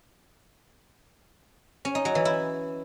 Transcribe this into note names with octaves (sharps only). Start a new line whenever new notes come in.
C#4
D#4
F#3
E3
E4